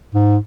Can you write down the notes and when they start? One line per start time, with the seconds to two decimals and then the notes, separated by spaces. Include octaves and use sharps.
0.15 G#2